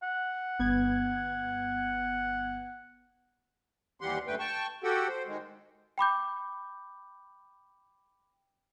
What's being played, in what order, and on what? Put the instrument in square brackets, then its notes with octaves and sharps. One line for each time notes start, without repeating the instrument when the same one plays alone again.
[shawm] F#5
[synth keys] G1 B3 G#6
[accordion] D#2 E3 G3 G4 F#5 C6
F#2 D3 A3 B4 G5
G5 A5 C#6
F#4 G4 A4 F#5 G5
C5
D#3 G#3
[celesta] G5 B5 D6 G6